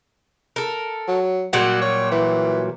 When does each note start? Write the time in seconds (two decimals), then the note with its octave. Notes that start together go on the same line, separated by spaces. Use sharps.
0.56 A4 A#4
1.08 F#3
1.53 A#2 F#3 G3 F#4
1.81 C#5
2.12 E3